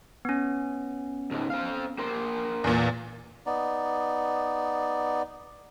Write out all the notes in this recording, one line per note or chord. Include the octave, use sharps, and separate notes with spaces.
B3 C#4
C#2 G#2
C4 F5
A#3 C5
E2 A#2
B3 D#4 D5